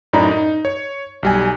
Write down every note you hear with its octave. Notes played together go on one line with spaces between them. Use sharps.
F#2 A2 D#4 D5 A#5 B5
D#4
C#5
B1 G3 G#5